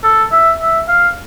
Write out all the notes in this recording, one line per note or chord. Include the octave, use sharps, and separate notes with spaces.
A4
E5
E5
F5